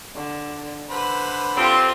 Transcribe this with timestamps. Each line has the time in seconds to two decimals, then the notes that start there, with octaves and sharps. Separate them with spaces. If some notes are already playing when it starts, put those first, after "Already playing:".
0.15 D3
0.90 D3 B4 C5 B5
1.57 G3 C4 F4 A4 C6